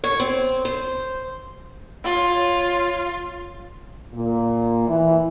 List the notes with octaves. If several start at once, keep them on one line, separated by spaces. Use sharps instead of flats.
C#5
C4
C5
F4 C#5
A#2
E3